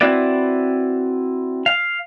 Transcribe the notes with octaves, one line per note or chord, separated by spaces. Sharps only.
C4 E4 F#4 B4 D5
F5